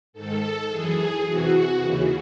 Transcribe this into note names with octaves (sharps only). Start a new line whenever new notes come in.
G#2 D#3 A4
F#2 E3 G#4
E2 C3 E3 F#4
D#2 C#3 E3